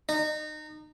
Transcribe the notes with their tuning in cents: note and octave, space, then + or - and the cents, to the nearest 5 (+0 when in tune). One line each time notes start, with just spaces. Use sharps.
D#4 -30